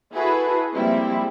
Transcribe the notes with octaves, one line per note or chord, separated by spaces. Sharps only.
E4 F#4 G#4 A4 B4 E5
F3 G3 G#3 A#3 C4 E4